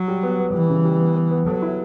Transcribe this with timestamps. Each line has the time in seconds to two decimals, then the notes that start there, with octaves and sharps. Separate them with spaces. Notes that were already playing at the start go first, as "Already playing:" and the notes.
Already playing: F#3
0.08 G3
0.23 B3
0.39 B3
0.54 E3 G3
0.70 C#3
0.85 G3
1.00 B3
1.16 B3
1.31 B3
1.46 F#3 A4
1.62 E4